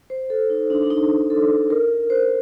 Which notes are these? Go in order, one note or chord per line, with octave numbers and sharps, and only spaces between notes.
C5
A4
D#4
D4
D4
D#4
A4
A#4
C5